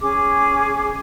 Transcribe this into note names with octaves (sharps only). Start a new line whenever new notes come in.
C#4 G#4 D6